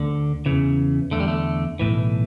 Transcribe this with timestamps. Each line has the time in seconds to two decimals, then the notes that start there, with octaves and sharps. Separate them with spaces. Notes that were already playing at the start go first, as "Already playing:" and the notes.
Already playing: D2 D3
0.46 E2 C#3 E3
1.11 E2 D3 A3
1.20 G3
1.28 A3
1.79 B1 A2 E3